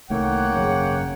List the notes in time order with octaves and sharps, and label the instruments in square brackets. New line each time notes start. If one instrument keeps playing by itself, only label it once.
[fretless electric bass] C2 D#3 A3 [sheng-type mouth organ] A#3 C#5 G5 [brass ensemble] F#5
[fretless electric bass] G#1 F#2 [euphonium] C#3